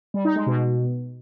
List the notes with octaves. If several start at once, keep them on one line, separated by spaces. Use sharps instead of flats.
G3
D#4
G#3
B2